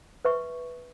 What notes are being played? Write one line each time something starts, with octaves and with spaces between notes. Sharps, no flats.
B4 E5 C#6